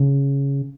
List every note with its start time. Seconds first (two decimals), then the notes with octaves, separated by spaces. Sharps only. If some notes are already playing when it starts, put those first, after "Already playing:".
Already playing: C#3